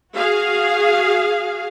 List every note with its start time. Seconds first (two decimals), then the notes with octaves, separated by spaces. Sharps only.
0.15 F#4 G#4 F5